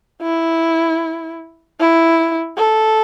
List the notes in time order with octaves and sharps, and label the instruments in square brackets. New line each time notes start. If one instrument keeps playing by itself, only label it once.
[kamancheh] E4
E4
A4